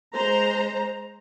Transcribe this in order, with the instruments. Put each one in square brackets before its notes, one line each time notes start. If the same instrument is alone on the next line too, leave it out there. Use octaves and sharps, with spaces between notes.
[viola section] G#3 C5 A#5